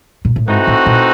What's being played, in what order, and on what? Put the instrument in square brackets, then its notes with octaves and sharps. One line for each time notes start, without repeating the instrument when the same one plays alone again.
[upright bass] A#2
A2
[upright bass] G#2 [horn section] E3 A3 C4 D#4 F#4
[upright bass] A2
A#2